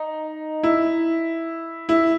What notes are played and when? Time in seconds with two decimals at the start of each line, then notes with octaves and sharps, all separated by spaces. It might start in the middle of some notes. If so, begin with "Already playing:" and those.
Already playing: D#4
0.63 E4
1.89 E4